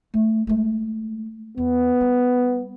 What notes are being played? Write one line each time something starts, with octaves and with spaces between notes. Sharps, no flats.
A3
G#3 A3
E2 B3
G3